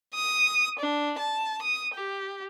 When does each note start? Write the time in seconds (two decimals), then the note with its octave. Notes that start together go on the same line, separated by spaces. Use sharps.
0.14 D#6
0.79 D4
1.19 A5
1.62 D#6
1.94 G4